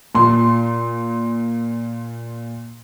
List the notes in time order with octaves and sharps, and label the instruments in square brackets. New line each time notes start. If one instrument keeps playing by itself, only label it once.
[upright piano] A#2 C6